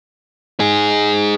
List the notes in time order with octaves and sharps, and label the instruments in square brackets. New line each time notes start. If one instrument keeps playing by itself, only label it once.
[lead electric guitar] D#4 G#4